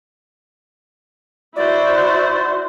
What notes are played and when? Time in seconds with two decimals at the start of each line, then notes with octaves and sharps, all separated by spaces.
1.55 E4 F#4 C5 D5